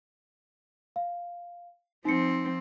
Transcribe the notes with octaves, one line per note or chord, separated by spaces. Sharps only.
F5
F3 C4 D#4 C#7